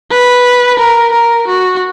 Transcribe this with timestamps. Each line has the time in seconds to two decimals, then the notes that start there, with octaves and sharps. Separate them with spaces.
0.11 B4
0.79 A#4
1.12 A#4
1.47 F#4